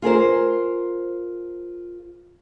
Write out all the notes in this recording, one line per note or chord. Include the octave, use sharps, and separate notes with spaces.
F4 G#4 A#4 C5